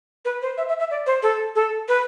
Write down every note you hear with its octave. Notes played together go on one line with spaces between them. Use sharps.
B4
C5
E5
E5
E5
D5
C5
A4
A4
B4